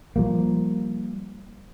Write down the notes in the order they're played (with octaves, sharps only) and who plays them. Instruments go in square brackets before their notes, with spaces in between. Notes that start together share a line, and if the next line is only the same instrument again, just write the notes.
[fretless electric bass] F3 G3 A#3